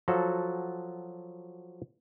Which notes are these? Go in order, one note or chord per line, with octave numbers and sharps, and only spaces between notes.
F3 F#3 F#4 A4